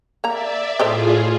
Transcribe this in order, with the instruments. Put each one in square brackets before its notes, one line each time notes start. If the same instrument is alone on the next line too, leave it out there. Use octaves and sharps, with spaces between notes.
[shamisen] A#3 A#5 [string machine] D5 E5
[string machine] A2 F4 G#4 [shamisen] A4 C5 D#5